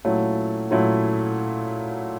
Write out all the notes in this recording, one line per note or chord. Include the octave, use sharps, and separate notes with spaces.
A#2 F#3 A3 C#4 E4
A#2 F#3 A3 C#4 E4